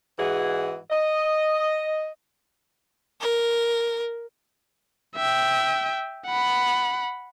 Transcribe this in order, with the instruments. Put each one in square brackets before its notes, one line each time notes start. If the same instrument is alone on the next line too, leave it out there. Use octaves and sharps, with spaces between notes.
[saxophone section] G#2 E3 F#4 G#4
D#5
[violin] A#4
[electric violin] E5 G5
F#5 B5